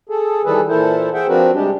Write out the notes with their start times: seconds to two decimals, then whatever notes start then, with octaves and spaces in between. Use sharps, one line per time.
0.09 G#4 A4
0.45 D#3 E3 G3 G#4 A4 B4
0.68 A#2 E3 E4 A4 A#4 C5
1.14 G#4 C5 E5 F#5 G5
1.28 F3 C4 D4 F#4 A#4 B4
1.54 C3 G3 G#3 D4 G4